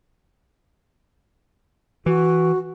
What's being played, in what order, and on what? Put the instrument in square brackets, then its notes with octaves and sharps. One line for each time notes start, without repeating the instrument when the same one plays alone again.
[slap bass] E3 [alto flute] F#4